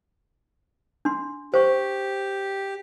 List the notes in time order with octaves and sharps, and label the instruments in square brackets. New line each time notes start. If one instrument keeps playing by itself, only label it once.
[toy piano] D4 C6
[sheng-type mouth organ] G4 [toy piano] C5 C#6